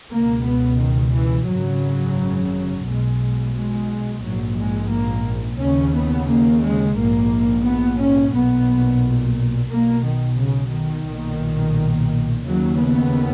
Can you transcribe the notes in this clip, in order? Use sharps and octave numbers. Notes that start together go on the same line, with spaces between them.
C#2 B2 A#3
B3
D#3
E3
G#1 F#2 C#3 F#3
B1 B2 G#3
G#3
A#1 G#2 F#3
G#3
A#3
D#2 C#3 C#4
B3
A#3
G#3
A#1 G#2 A#3
B3
C#4
B1 A#2 B3
B1 B2 A#3
D#3
C#3
D#3
B1 A#2
D#2 C#3 F#3
B3